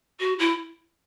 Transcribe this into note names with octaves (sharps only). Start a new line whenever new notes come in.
F#4
E4